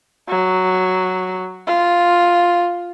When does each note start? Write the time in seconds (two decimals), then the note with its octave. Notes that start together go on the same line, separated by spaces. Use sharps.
0.29 F#3
1.67 F4